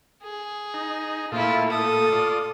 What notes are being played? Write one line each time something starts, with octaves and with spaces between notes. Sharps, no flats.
G#4
D#4
A#2 A3 E4 F4
A4 D#6
F4 D5